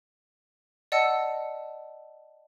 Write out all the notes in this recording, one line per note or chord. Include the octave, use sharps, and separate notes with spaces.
D5 D#5 F#5 A5 E6 C#7